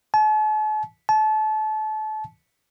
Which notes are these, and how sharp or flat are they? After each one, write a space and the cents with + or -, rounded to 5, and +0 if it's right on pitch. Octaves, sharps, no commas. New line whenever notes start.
A5 -45
A5 -30